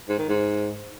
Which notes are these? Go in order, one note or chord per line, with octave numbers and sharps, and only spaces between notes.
G#2
D#3
G#2